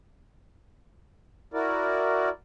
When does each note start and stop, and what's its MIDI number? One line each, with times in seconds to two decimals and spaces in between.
1.54 2.29 64
1.54 2.29 66
1.54 2.29 70
1.54 2.29 74